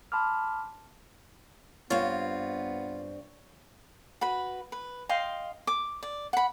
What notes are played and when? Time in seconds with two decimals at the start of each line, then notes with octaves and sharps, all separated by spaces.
0.12 A5 B5 C6 D6 F6
1.91 G2 B3 C4 F4 C#5
4.21 F#4 B4 B5
4.72 B4
5.09 D#5 F5 G5 C6
5.67 D6
6.03 D5
6.33 F#5 B5